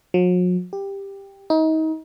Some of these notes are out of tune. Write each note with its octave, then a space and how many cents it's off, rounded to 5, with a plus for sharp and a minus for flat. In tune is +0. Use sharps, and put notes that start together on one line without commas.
F#3 -45
G4 +10
D#4 +30